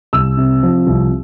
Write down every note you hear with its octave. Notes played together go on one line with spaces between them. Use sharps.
C2 E6
C3
F3
C2